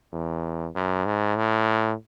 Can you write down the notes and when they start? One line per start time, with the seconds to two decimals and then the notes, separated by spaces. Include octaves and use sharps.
0.13 E2
0.75 F#2
1.06 G#2
1.37 A2